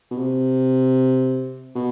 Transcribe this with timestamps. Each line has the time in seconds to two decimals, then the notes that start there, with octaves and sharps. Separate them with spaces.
0.11 B2
0.18 C3
1.75 B2